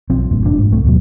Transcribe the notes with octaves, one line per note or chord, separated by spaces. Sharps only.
B1 F3 C4
F1 G2 A#2
F1 A2 F3 D4
G#2
C2 C3 A3
D#2 B2 F#3